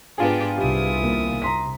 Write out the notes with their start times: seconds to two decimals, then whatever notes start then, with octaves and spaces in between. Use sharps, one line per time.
0.18 G#2 B3 D4 F4 G4 G#4
0.58 C2 C3 E4 G4 D#6
1.02 D#2
1.42 C3 A#5 C6 B6